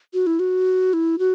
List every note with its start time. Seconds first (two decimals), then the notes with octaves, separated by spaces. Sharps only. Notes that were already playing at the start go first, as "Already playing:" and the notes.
0.14 F#4
0.27 E4
0.39 F#4
0.93 E4
1.19 F#4